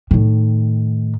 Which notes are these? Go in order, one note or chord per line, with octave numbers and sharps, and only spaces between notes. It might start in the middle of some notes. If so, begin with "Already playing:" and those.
A2 D#3